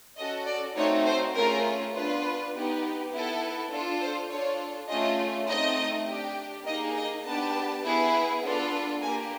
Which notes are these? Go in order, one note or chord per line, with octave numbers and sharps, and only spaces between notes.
C#4 F#4 A4 D#5
D5
A3 C4 D#4 F#4 C#5
C5
A3 C#4 F4 G#4 A#4
B3 D4 F4 B4
B3 D#4 G4
B3 E4 A4
D4 F4 A4
C5
D4 F4 A4 C#5
A3 C#4 F4 G#4 D#5
A3 C4 D#4 D#5
D4 G4
A#3 D#4 G#4 D#5
D#5
B3 D4 G4 A5
B3 E4 G#4
B3 D4 F4 A4
A#3 D4 G4 G#5